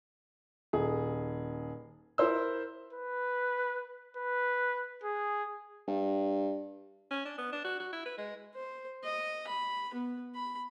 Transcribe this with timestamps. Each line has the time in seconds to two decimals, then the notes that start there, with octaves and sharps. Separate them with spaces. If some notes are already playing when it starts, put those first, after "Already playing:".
0.73 D#1 G#4
2.18 E4 A#4 C5 E6
2.93 B4
4.17 B4
5.04 G#4
5.88 G2
7.11 C#4
7.25 D4
7.38 B3
7.52 D4
7.64 F#4
7.80 F#4
7.92 E4
8.06 B4
8.17 G#3
8.55 C5
9.04 D#5
9.48 B5
9.94 B3
10.35 B5